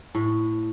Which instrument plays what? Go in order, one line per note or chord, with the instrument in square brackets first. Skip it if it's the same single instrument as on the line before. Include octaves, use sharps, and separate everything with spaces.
[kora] A2